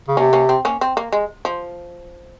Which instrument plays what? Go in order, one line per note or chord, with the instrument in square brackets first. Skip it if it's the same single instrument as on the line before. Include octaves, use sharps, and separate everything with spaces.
[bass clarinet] C#3
[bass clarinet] C3 [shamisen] A#3 C#4
[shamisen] A#3 C#4
C4
A#3 C#4
C4
A#3
G#3
F3